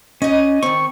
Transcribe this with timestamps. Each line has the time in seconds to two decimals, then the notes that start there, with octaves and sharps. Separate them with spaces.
0.22 C#4 D#4 D#5
0.63 D#3 C4 C#6